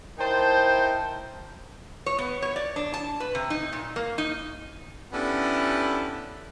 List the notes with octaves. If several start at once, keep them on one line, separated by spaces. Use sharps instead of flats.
D#4 E4 A#4 C5 G5 A5
C#5
B3
C#5
D5
D4
A5
B4
C3
D#4
A#2
A#3
D#4
B3 C#4 D4 E4 G4 A4